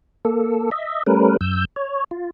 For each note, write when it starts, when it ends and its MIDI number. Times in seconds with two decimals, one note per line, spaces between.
0.25 0.70 58
0.25 0.70 69
0.71 1.03 75
0.71 1.03 76
1.06 1.37 55
1.06 1.37 57
1.06 1.37 61
1.06 1.37 70
1.06 1.37 71
1.41 1.65 42
1.41 1.65 88
1.41 1.65 91
1.76 2.04 73
2.11 2.30 65